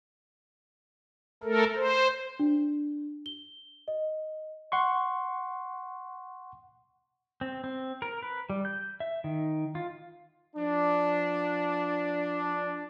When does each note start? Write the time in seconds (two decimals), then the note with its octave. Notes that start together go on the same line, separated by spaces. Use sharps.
1.43 A3 A4 A#4
1.76 C5
2.39 D4
3.26 G7
3.88 D#5
4.72 F#5 C6 C#6
7.41 C4
7.64 C4
8.02 A#4
8.23 B4
8.50 G3
8.65 G6
9.00 E5
9.24 D#3
9.75 F4
10.56 F3 D4